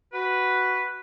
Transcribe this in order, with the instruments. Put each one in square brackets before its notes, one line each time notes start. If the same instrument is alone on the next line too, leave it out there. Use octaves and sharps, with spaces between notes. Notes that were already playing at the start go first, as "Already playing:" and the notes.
[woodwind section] F#4 B4